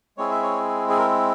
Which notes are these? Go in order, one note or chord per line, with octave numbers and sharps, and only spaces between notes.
G#3 C4 E4 G#4 C#5
E5
C#5
G#4
A#4